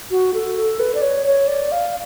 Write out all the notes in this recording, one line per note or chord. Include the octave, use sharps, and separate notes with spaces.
F#4
A4
A4
B4
D5
C#5
C#5
D5
F5